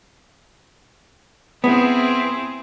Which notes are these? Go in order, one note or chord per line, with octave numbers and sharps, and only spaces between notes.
B3 C4 E4 G#4